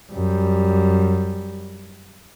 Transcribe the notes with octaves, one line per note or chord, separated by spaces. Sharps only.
F#2 G3